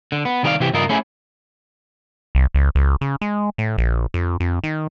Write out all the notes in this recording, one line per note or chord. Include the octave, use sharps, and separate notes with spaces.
D3
B3
C2 D#3 G4 A#4 D5 F5
C3 E3 G4
G2 C#3 E4 F4 A#4 D#5
A3 C#4 E4 G#4
C2
C#2
C#2
C#3
G#3
A2
A#1
F2
F2
D#3